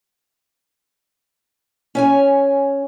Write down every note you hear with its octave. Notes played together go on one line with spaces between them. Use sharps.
C#4 C#5 G#5